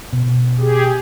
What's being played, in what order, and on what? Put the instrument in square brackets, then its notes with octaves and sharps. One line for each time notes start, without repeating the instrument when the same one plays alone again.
[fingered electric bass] B2
[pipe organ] G4 G#4